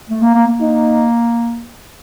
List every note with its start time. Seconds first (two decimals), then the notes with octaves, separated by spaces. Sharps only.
0.09 A3
0.22 A#3
0.34 A#3
0.47 A#3
0.60 D#4